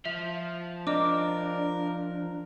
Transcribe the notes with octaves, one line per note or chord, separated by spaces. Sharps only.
F3 E5
D4 A#4 D#5 D6